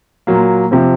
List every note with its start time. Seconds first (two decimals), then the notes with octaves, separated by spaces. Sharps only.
0.27 A#2 F#3 A#3
0.71 C3 F3 C4